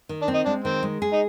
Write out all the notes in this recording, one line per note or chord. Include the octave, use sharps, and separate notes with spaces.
D#3
D4
C4
D#4
G#3 D4
D#3 C4
G#3
G#4
D#4